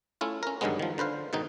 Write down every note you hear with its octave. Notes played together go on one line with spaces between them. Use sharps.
A3 C#4 E4 F4
C#4 A#4
G2 D3 D#3 F#3 G#3 B3
D#3 F3
D3 B4 C5 F5
G#2 B2 D#3 D#4